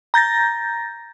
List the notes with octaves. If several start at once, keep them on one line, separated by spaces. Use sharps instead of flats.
A#5 G6 A6 A#6